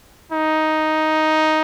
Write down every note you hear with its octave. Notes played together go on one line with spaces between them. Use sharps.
D#4